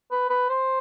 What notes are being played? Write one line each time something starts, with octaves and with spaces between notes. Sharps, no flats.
B4
B4
C5